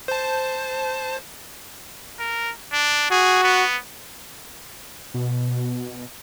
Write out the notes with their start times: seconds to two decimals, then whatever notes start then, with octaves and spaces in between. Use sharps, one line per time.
0.08 C5 A5
2.19 A#4
2.72 D4
3.11 F#4 G#4
3.43 B3
5.14 B2